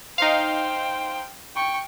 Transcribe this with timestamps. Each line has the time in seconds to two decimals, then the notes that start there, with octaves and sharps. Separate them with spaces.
0.18 D#4 C5 F5 G5
1.55 G5 C#6